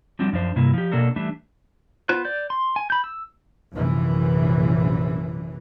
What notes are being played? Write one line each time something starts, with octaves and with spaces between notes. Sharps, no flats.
F3 G3 C4 D4 F#4
F#2 F3 D4 C5
G2 C3 A#3 E4
F3 G4
B2 A#3 D4 A4 A#4
E3 G3 A3 D4 E4
B3 F4 C5 F#6
D5 G6
C6
G#5
B5 G6
E6
A#1 F#2 C3 E3